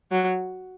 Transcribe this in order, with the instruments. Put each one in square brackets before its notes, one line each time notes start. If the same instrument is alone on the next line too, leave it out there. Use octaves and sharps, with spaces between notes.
[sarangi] F#3